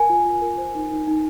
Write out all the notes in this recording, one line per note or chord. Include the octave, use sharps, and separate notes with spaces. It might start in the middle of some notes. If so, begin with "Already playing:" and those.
Already playing: A#4 G#5
F4
F4
A#4
C5
D#4
D#4
D#4